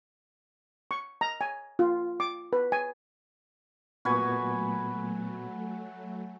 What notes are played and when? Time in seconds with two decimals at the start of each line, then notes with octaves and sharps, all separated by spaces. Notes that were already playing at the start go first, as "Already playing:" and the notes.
0.91 C#6
1.21 A#5
1.41 G#5
1.79 F4
2.20 D6
2.53 B4
2.72 G#5
4.05 A#2 F#3 A3 B3 F#4 B4 G#5